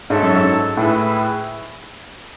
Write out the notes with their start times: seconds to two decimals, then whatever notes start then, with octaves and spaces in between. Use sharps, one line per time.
0.10 G#2 F#4 A4 C#5 E5
0.23 F#2
0.36 G#2
0.77 A2 E4 G#4 B4 E5